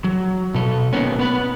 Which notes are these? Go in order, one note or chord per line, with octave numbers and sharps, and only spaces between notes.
F#3
B2 A4
B2 D#3 F3 A#3 B3 C#4
B3 B4